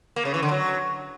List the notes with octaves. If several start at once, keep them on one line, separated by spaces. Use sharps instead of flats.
A#3
C#3
E3
D3
F#3